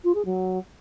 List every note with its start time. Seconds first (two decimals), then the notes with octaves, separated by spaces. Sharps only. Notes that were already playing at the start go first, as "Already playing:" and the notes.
0.04 F4
0.15 G#4
0.25 F#3